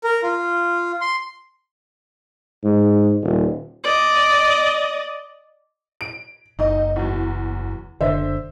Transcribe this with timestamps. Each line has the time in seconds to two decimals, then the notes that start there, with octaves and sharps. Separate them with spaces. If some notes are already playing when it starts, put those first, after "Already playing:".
0.04 A#4
0.23 F4
1.01 C6
2.64 G#2
3.23 D#1
3.84 D5 D#5
6.01 D7
6.59 F#1 D#4 D#5
6.96 E2 F#3
8.01 F#1 D3 C5 E5